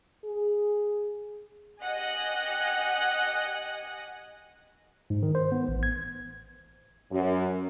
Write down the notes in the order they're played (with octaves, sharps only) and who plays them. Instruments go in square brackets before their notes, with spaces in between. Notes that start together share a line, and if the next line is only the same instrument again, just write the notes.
[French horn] G#4
[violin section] G4 D#5 F#5 G#5
[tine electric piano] G#2
D#3
C5
B3
A1
G#6
[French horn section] F#2